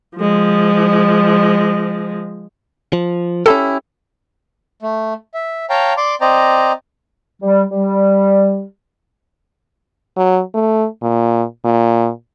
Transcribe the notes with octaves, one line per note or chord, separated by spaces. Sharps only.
F3 G#3
F3
C#4 E4 G4 A4
A3
E5
C#5 F5 G5 A5 A#5
D5 C6 D6
C4 C5 D5 D#5 A#5
G3
G3
F#3
A3
A#2
A#2